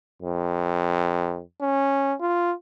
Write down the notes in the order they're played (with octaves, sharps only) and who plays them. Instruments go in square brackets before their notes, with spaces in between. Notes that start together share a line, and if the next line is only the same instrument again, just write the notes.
[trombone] F2
C#4
F4